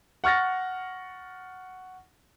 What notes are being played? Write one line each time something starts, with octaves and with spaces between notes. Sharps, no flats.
F#5 C#6 F6 A6 A#6